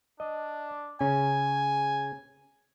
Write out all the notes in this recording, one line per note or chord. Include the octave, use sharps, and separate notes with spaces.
D4 D#5
C#3 C#4 G#5